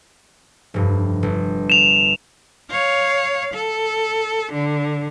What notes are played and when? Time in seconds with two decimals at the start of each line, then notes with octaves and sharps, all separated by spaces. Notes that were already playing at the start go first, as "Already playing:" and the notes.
0.74 F1 G2
1.23 G1
1.70 E7 F7
2.70 C#5 F5
3.54 A4
4.52 D3